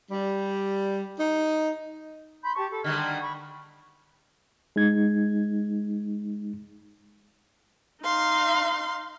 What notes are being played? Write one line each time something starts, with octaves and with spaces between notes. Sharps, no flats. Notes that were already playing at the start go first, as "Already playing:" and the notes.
G3
D#4
B5 C6 G6
G4 A5 C#6
A4
D3 D#3 G3 F6 G#6
B5 C#6
G#3 D#4 G#6
D#4 F5 C6